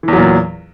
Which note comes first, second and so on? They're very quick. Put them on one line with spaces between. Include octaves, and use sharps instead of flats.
E3 E2 F#3 A#2